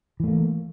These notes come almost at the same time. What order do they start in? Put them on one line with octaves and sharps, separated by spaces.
E3 A3 A#3